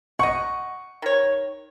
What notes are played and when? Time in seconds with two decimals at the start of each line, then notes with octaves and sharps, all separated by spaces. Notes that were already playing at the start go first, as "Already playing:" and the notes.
0.19 D#5 F#5 C#6
1.02 D#3 C#5